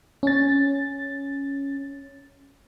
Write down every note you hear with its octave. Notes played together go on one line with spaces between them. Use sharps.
C#4 A6